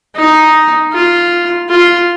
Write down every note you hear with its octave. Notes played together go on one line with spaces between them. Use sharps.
D#4
F4
F4